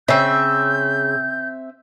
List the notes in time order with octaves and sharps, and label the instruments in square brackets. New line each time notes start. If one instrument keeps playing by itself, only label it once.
[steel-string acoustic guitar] C#3 [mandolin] C4 E5 [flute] G6